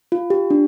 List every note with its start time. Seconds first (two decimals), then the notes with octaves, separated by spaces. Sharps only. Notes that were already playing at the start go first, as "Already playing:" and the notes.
0.12 F4
0.30 G4
0.50 D4